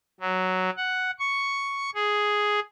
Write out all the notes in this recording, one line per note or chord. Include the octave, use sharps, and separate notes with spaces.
F#3
F#5
C#6
G#4